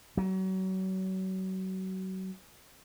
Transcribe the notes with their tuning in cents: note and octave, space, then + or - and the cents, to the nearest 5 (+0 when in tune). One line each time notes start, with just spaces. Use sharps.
F#3 +30